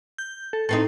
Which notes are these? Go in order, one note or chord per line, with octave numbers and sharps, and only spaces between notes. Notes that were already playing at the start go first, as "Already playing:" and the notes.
G6
A4
A2 C4 D#4 A4